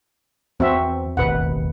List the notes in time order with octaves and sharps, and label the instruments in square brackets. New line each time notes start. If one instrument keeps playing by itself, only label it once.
[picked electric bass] E2 [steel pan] C4 F#4 E5
[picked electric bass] E1 A1 D#2 [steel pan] B4 F#5